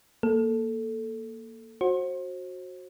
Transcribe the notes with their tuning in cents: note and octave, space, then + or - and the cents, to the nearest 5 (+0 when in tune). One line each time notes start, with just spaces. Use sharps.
A#3 +0 A4 +0
F#4 -10 C5 +30